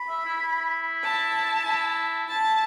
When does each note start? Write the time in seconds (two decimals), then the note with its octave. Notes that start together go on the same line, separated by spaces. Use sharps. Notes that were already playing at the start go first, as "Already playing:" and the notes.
Already playing: B5
0.09 E5
0.25 E4
0.40 E4
1.02 A5
1.65 E4
2.26 E4 A5